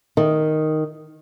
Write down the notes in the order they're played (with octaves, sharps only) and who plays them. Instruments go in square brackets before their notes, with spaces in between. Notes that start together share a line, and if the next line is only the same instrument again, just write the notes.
[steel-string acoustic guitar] D#3